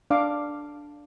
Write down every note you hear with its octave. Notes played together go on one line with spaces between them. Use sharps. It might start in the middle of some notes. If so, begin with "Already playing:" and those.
D4 F5 D6